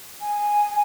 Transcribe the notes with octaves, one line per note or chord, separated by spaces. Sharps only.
G#5